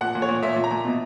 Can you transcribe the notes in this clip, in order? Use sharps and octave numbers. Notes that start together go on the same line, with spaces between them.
A#2 F#5
A#2
C#5
A#2
A#2 E5
A#2
A#5
A#2
B2